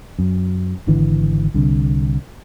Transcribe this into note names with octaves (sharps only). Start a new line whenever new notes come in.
F#2
G#1 D3 E3
C2 D3